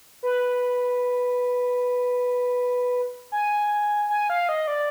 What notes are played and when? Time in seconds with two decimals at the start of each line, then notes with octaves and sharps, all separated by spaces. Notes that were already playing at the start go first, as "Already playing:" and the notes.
0.23 B4
3.32 G#5
4.09 G#5
4.30 F5
4.49 D#5
4.68 D5